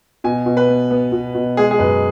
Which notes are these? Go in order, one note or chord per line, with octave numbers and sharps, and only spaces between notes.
B2 G#5
B2
B4
B3
B3
B2
B2
G#3 G#4
G#4
F#2 B4